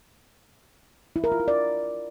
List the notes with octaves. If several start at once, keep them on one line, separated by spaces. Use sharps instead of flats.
E4
A#4
F4
E4
D5